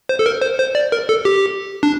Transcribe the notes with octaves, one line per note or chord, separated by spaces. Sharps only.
C5
A4
A#4
C5
C5
D5
A#4
A4
G4
D4